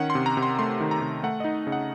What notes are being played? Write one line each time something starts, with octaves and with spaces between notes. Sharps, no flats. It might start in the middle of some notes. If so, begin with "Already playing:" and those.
Already playing: D#3 C#4 F#5
C6
C3
A#5
C3
C6
A3 C6
D#3
A#5
C3
A3 F#5
D#4 D#5
C#3
F#5